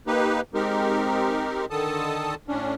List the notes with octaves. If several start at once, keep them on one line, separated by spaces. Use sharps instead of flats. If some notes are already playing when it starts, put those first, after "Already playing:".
A#3 D#4 G4 B4
G#3 C4 D#4 G4 A#4
D3 D#3 A4 A5 D#6
A2 C#4 D4